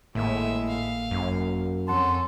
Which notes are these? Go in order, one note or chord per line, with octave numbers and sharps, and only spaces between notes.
G#1 A2 G#3 A#3 E5
F5
F#2
F2 C#4 A4 F#5 A5 C6